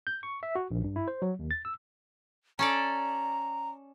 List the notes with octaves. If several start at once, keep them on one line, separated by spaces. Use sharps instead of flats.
G6
C#6
E5
F#4
A#1
G2
E4
C5
F#3
D#2
A6
E6
C#4 A4 D5 A#5